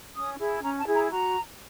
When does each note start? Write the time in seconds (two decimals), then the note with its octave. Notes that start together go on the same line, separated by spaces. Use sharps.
0.15 C#4 D#6
0.39 E4 G#4
0.62 C#4 A#5
0.78 A5
0.86 E4 G#4
0.94 A#5
1.10 F#4 A#5